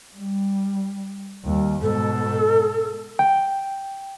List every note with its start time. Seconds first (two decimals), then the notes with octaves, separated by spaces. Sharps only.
0.17 G3
1.44 D#2 G3
1.82 G#2 B2 A4
3.19 G5